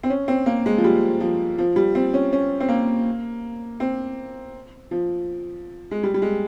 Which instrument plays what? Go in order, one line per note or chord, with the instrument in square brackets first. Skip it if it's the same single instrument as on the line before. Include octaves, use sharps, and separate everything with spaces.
[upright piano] C4
C#4
C4
A#3
G#3
F3
G3
F3
F3
G3
C4
C#4
C#4
C4
A#3
C4
F3
G#3
G3
G3
G#3